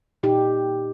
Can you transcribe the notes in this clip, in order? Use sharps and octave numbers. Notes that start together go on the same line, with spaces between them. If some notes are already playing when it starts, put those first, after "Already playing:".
A#2 D#4 G4